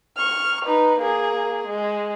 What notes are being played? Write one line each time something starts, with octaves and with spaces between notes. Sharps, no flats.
C#6 F6
D#4 B4
A#3 G#4
G#3